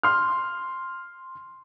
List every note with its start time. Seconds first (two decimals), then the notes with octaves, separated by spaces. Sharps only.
0.03 C6 F6